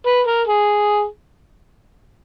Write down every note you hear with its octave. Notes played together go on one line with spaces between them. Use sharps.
B4
A#4
G#4